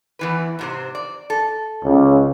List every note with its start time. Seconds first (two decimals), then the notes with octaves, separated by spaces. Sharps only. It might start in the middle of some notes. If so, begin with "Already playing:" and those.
0.19 E2 E3 B4
0.59 G#2 C3 C5
0.95 D5
1.30 A4
1.83 C#2